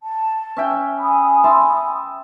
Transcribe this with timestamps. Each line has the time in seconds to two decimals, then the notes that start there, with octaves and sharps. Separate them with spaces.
0.03 A5
0.57 C#4 E5 G5
0.99 G#5 B5 D#6
1.44 E5 A5 C6